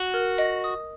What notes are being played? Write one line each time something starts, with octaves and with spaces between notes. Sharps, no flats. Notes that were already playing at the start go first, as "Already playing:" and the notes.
Already playing: F#4
A#4
D#5
D#6